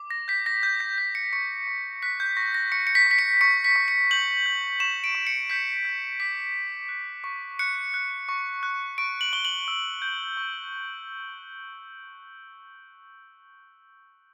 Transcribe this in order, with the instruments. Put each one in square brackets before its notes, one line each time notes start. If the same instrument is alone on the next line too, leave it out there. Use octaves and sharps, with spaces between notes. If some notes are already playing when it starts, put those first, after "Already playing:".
Already playing: [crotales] D6
A#6
G6 B6
A#6
G6
A#6
G6 B6
C#7
C#6 C#7
C#6
F#6 B6
G6
C#6 A#6
A#6
C#6 C#7
C#7
B6
C#6 B6
C#7
C#6 C#7
B6
C#6
C#7
G6 F#7
G6
C#6 E7
D7
C#6
C#7
G6 B6
G6
D6 B6
G6
F#6
C#6
F#6 C#7
F#6
C#6
F#6
C#6 D7
F#7
C#6 G7
F#7
E6
G6
C#6